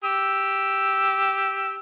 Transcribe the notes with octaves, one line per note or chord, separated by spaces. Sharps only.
G4 E6